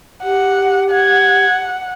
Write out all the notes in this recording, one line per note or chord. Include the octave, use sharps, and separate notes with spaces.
G4 F#5
F#5 G#6